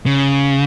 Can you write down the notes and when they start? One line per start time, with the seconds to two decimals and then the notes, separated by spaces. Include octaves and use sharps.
0.06 C#3